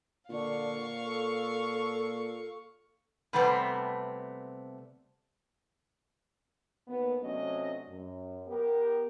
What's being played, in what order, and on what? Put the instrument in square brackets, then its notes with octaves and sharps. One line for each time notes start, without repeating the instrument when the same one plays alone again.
[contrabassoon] A#2 [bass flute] D3 [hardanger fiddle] F5 C#6
[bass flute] A4
[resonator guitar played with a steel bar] C3 G3 A3 B3 C4 D4
[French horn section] D#2 B3
C3 F#3 A3 C#4 D4 D#5
F#2
B3 G4 A#4